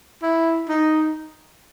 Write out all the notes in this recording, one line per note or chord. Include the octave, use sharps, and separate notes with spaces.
E4
D#4